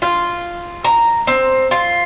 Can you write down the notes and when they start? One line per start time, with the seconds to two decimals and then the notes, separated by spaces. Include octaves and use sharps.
0.02 F4
0.84 A#5
1.27 C4
1.71 F4